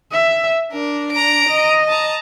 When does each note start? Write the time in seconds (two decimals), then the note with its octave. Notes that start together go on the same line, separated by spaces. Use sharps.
0.12 E5
0.72 D4 A#4
1.12 A#5 D7
1.50 D#5
1.89 A5 A#5